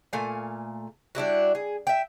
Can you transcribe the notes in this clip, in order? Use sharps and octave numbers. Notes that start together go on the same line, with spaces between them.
A#2 A3 F5 G#5
G3 D4 E4 F#4
G#4
E5 G5